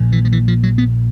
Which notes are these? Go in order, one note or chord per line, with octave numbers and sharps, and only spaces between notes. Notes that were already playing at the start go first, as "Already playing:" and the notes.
Already playing: A#1 A#2
E3
F3
E3
F3
F#3
B3